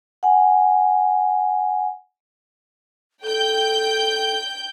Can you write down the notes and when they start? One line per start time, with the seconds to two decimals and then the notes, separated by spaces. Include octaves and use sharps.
0.23 F#5 G#5
3.23 A4 G5 G6